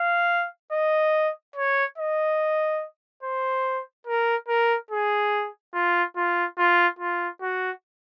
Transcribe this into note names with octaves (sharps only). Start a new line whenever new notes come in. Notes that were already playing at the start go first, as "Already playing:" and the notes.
Already playing: F5
D#5
C#5
D#5
C5
A#4
A#4
G#4
F4
F4
F4
F4
F#4